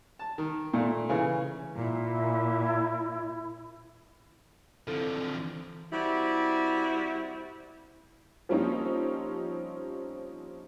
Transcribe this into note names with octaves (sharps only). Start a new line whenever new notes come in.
A5
D#3
A#2 A3
C#3 E3
A#2 E4
D3 D#3 F3 C4 E4 A4
D#3 E3
G3 C4 E4 F#4
F3 G3 A#3 C4 C#4 D#4